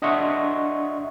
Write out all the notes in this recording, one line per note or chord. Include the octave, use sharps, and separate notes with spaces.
D4 D#5 E5 F#5 C6 C#6